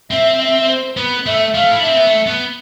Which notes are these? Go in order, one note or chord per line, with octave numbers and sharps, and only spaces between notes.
C4 E5
E5
C5
B3 B4
A3 E5
A3 F5
E4
D4
C4 E5
B3
A3
B3